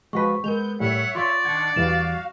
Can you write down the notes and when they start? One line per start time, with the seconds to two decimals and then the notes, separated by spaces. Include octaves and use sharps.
0.13 F3 G#3 F#4 B4 C#6 B6
0.44 G#3 B3 A#4 G6 F7
0.80 A2 G3 C#5 E5 F#5
1.15 F4 D5 C6 C#6
1.45 D#3 D4 F#5 G#6
1.76 E2 E3 G3 F#4 F5 E7